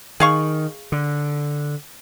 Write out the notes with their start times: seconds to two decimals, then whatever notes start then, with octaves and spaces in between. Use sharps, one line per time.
0.20 D#3 G#4 F5 C#6
0.92 D3